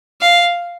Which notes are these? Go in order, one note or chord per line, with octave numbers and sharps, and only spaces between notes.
F5